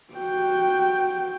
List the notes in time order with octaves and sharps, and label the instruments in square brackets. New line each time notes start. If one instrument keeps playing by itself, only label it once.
[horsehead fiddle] F#4 G5